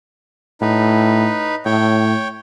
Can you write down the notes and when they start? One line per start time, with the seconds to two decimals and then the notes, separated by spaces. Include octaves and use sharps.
0.61 A2 D#4 B4
1.65 A2 C#5 G5